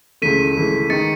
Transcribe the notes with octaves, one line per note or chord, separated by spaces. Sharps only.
C#2 C#3 E3 A3 B6 D#7
C#2 C#3 E3 A3
D#3 G#3 D#4 A6 C#7